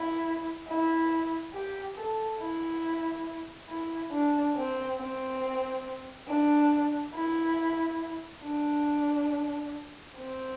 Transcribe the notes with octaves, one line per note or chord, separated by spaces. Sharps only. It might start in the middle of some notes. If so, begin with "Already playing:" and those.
Already playing: E4
E4
G4
A4
E4
E4
D4
C4
C4
D4
E4
D4
C4